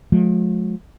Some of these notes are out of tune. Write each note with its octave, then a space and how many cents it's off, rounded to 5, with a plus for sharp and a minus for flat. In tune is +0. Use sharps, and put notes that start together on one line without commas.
F3 +45 G#3 +45